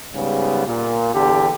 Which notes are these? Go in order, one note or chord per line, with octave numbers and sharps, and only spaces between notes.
G#2 C#3 G3 B3
A#2
E2 D3 G4